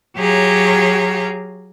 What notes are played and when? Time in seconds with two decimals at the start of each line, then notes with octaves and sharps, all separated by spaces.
0.17 F#3 G4 G#4 C#5 F5 A#5